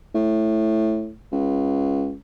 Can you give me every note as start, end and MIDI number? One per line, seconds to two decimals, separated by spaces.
0.15 1.12 45
1.32 2.14 37